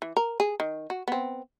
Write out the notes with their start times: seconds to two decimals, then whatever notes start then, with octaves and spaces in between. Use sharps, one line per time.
0.02 E3
0.17 A#4
0.40 G#4
0.60 D#3
0.90 F#4
1.08 B3 C4